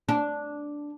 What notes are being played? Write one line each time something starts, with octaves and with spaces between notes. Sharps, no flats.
D4